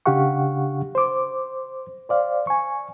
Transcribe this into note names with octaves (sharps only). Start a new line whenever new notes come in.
C#3 D4 G4 F5 F#5 C#6
C5 D6
C5 D5 F5
G#5 C#6